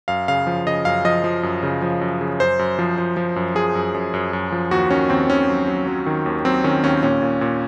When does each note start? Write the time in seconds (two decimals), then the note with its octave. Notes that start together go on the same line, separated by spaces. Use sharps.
0.08 F#2 F5
0.28 C#3 F5
0.47 F3
0.66 C#3 D#5
0.85 F#2 F5
1.05 F3 D#5
1.24 F3
1.43 F#2
1.63 C#3
1.82 F3
2.01 F#2
2.21 C#3
2.40 F#2 C5
2.59 F#2
2.79 F3
2.98 F3
3.17 F3
3.36 F#2
3.55 F3 G#4
3.75 F#2
3.94 F#2
4.14 F#2
4.33 F#2
4.52 F3
4.71 D#2 F#4
4.90 D#3 C#4
5.10 D#2 C4
5.29 D#2 C#4
5.49 F#3
5.68 F#3
5.87 F#3
6.06 D#3
6.26 D#2
6.45 F#3 C4
6.64 D#3 C#4
6.83 D#2 C#4
7.03 A#2 C#4
7.22 A#2
7.41 A#2